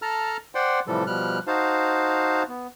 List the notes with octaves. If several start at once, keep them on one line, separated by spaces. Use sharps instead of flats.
A4 A5 A#5 F6
C5 D5 F#5 G5 C6
A2 C3 E3 F3 G3 A4
B2 F3 G3 F6 F#6
D#4 F#4 C5 F5 A5
B3